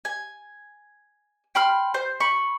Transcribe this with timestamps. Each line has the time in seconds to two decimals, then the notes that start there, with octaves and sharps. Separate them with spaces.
0.05 G#5
1.55 G5 B5 C6 F6
1.94 C5
2.20 B5 C#6